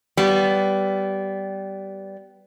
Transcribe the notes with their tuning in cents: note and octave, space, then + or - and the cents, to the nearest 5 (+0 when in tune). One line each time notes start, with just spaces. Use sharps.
G3 -15 B3 +0